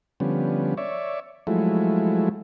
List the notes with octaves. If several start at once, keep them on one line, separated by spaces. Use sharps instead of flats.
D3 F3 G3 B3 C#4
C#5 D5 E5
F3 F#3 G#3 A3 E4